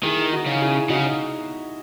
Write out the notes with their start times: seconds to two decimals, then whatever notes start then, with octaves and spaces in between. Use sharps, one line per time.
0.03 D#3 E4 G#4
0.32 D#4 F#4
0.46 C#3
0.60 E4 G#4
0.89 C#3 D#4 F#4